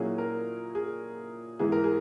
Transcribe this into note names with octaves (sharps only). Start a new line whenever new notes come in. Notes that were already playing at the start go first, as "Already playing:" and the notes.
Already playing: A#2 F#3 A#3 C#4 E4 G#4
A#4
G#4
G#2 E3 B3 E4 G#4
A#4
G#4